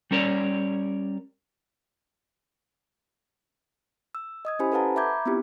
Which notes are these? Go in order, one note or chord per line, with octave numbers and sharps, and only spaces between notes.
G3 C#4 A#4 C#5 D5
E6
D#5 D#6 G#6
C#4 E4 G4 C5 G#5 B5
A4 B4 F5 F#5 A5 A#5
E5 A#5 B5 D6 G6 G#6
B3 C4 D4 E4 F4 G4